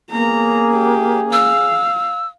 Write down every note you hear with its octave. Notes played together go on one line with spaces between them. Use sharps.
A#3 B3 C#4 G#4 A#5
G4
F5 E6